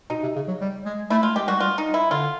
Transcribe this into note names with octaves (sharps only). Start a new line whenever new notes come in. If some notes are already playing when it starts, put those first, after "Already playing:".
B2 D#4
C3
C#3
F#3
G3
G#3
A3 E4
A3 F4
G#3 G4
G3 F#4
G3 F4
D#4
E4
D3 F4